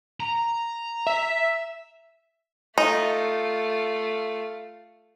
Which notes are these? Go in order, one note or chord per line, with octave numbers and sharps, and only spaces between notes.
A#5
E5
A3 D#4 F4